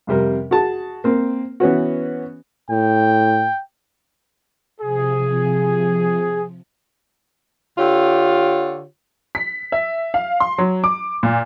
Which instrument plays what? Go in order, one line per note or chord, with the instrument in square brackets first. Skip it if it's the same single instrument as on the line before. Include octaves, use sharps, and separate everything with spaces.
[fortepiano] F2 C3 G3 A#4
F#4 G#4 A5
A#3 C4
E3 B3 C#4 F#4
[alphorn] A2 [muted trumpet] G5
[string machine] C3 F3 [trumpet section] G#4
[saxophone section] D3 F4 G4 C#5
[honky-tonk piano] B6
E5
F5
C6
F#3
D6
A#2